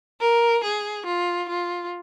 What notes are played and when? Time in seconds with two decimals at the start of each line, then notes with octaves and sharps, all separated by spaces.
0.21 A#4
0.64 G#4
1.06 F4
1.49 F4